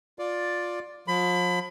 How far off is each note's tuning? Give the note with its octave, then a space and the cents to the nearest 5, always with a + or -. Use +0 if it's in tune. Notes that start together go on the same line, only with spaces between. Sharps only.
F4 +15 D5 +0
F3 +40 B5 +25